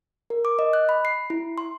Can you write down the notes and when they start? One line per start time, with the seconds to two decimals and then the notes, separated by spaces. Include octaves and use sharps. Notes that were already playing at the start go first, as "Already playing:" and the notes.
0.30 A#4
0.45 D6
0.59 D#5
0.73 F#6
0.89 B5
1.05 C7
1.30 E4
1.58 C6